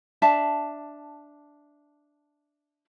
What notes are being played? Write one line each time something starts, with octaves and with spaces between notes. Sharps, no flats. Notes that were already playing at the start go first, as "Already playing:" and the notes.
D4 E5 A5